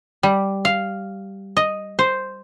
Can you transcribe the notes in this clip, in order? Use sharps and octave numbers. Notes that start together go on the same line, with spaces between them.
G3
F5
D#5
C5